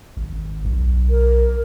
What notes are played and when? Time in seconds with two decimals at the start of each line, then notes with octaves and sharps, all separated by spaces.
0.17 G#1
0.65 B1
1.10 A#4